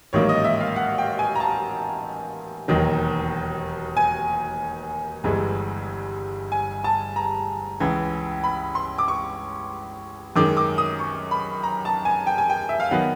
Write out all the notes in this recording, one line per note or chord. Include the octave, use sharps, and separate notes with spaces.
A1 G#2 D#3 F#3 A#3 C#5
D#5
E5
F5
F#5
G5
G#5
A#5
A5
E1 D#2 D#3 F#3
G#5
G1 G2 E3 G#3
G#5
A5
A#5
C#2 C#3 E3
B5
C6
D6
C#6
F#2 D#3 G#3 D6
D6
D#6
C#6
B5
A#5
A5
G#5
G5
G#5
G5
E5
F5
D#3 F#3 B3 F#5